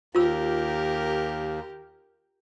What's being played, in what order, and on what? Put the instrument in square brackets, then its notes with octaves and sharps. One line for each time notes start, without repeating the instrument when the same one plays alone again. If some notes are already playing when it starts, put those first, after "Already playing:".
[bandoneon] D#2 [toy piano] F4 E6 [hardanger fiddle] G4 A#4